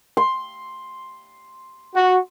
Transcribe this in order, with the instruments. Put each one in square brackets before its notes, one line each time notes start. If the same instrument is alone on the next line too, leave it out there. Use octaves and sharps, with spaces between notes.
[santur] C6
[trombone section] F#4